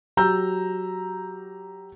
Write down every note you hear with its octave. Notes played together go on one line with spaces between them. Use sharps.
F#3 G4 A#5 E6 G6